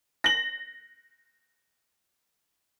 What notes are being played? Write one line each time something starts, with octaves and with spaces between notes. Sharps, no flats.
A#6 F#7